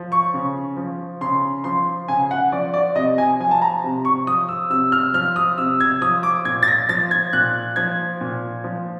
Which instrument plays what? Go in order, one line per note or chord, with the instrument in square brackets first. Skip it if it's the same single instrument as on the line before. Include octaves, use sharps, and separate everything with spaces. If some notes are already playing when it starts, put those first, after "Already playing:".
Already playing: [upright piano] F3
C#6
C#3
F3
C#3 C6
F3 C6
C#3 G#5
F#5
F3 D5
D5
C3 D#5
G#5
F3 G#5
A5
A#5
C3
C#6
F3 D#6
E6
C3 E6
F6
F3 F6
D#6
C3 E6
G#6
F3 D#6
D6
A#2 G#6
A6
A#6
F3 A6
G#6
A#2 F#6
F3 G#6
A#2
F3